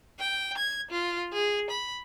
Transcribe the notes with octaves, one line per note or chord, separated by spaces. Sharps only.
G5
G#6
F4
G#4
B5